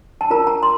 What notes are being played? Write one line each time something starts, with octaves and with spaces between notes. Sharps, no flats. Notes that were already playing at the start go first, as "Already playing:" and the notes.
A5
F4 A#4 A#5
A#5
C6